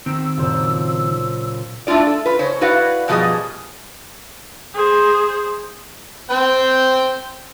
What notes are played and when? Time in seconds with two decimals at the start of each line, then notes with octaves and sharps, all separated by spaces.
0.06 D#3 C4 E6
0.37 F#1 A#2 F4 C5 D5
1.87 A3 D4 E4 F4 D5
2.07 A4
2.26 F4 B4
2.39 C#3 C5 C#5
2.61 E4 F#4 B4 D5 F5 F#5
3.08 F#2 B2 F3 G3 G#4 D#5
4.74 G#4 C5
6.30 C4 C5 G5